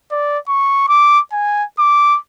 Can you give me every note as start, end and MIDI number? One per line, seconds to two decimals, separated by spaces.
0.11 0.38 74
0.48 0.87 85
0.88 1.20 86
1.32 1.64 80
1.79 2.17 86